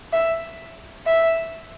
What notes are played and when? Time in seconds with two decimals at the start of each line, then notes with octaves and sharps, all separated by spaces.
0.13 E5
1.06 E5